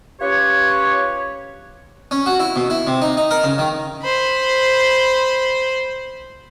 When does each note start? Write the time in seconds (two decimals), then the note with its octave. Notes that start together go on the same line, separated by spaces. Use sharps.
0.20 C#4 F4 G4 B4 C#5
2.11 C#4
2.26 F#4
2.40 E4
2.56 B2
2.70 E4
2.87 C3
3.02 D#4
3.17 D#4
3.31 A#4
3.44 C#3
3.58 D#3
4.03 C5 B5